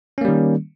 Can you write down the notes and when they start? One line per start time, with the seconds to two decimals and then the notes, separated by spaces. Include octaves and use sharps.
0.18 C#4
0.21 A#3
0.25 G3
0.28 D#3